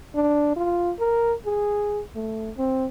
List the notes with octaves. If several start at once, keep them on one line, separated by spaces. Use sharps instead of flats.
D4
F4
A#4
G#4
A3
C4